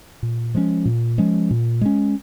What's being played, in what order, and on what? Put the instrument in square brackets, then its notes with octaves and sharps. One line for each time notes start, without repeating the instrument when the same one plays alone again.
[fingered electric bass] A#2
F3 G#3 C#4
A#2
F3 G#3 C#4
A#2
G#3 C#4